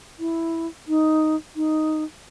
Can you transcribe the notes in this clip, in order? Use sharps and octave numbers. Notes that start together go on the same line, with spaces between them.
E4
D#4
D#4